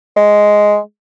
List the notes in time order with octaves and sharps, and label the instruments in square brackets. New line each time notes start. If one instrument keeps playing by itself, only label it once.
[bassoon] G#3